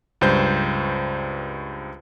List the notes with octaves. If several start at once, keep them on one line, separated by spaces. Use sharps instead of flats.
C#2 G2 C5 G6